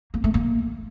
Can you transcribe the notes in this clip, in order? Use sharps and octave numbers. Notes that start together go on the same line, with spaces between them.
A#3
A3
A#3